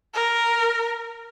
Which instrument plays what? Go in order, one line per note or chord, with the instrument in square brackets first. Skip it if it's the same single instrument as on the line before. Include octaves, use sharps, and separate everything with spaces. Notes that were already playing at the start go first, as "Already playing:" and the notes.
[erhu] A#4